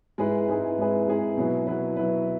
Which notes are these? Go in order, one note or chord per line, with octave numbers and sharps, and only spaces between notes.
G#2 G#3 E4 G#4 B4
G#2 G#3 E4 G#4 B4
G#2 G#3 E4 G#4 B4
G#2 G#3 E4 G#4 B4
B2 F#3 E4 B4
B2 F#3 E4 B4
B2 F#3 E4 B4